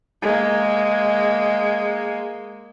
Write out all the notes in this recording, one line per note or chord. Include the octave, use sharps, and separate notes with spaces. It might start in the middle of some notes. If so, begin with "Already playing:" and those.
G#3 A#3